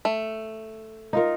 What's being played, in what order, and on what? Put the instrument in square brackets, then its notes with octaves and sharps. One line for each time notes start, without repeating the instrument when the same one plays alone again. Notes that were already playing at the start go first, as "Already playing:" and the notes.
[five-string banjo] A3
[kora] D#4 F4 A#4